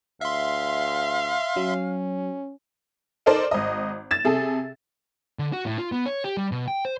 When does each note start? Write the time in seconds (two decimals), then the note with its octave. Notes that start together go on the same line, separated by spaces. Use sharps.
0.21 D2 E5 F5 C6
1.57 F#3 C#4
3.26 D#4 A4 A#4 C5 D5
3.51 G#1 D#5
4.11 A6 E7
4.25 C3 G#4 A4
5.39 D3
5.53 F#4
5.66 A2
5.78 F4
5.92 B3
6.06 C#5
6.24 G4
6.37 G3
6.52 B2
6.68 G5
6.85 C5